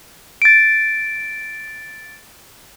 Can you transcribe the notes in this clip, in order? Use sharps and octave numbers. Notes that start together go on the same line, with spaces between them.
A6 D7